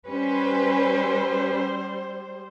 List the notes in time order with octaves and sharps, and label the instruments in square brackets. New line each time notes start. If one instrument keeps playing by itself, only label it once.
[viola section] G3 C5 [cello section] C#4 B4